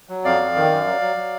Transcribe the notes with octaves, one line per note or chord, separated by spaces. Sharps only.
F#3
F2 D5 F5
F2
D#3
F#2
F#3
F#3
F#3